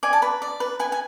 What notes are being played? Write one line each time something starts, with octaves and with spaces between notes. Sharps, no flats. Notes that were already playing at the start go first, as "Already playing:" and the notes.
D5 G#5
A5
B4 B5
D5
B4
B4 G#5
G#5